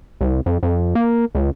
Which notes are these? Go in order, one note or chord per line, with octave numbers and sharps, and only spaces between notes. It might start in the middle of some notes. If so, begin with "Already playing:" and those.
C2
F2
F2
A#3
C#2